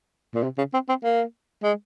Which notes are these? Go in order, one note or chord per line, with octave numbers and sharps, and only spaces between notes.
A#2
C3
C#3
C4
C4
A#3
G#3